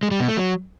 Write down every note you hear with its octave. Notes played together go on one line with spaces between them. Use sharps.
G#3
G3
B2
A3
F#3